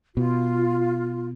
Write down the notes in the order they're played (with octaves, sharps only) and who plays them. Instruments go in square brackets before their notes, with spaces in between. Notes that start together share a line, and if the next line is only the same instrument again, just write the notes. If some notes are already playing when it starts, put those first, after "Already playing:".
[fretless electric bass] B2 [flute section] F4